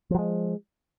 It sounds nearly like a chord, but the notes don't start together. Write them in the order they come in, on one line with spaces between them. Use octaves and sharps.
F3 F#3 G#3